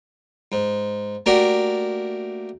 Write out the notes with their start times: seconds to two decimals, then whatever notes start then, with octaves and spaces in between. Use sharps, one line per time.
0.52 G#2
1.26 A3 A#3 D4 F#4 G4 A#4